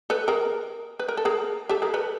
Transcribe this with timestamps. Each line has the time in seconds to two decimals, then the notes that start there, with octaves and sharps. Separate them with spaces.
0.10 A4 B4
0.28 G#4 A#4
0.99 B4
1.08 A#4
1.17 A4
1.25 G#4 A#4
1.69 G4 A4
1.82 G#4 A#4
1.94 A4 B4